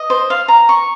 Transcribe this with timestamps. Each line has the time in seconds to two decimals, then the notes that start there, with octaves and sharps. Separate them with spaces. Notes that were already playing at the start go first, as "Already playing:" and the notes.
Already playing: D#5
0.10 C5
0.30 F5
0.48 A#5
0.69 C#6